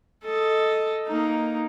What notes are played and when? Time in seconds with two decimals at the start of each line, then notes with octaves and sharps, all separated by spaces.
0.24 A4 D#5
1.07 A#3 D#4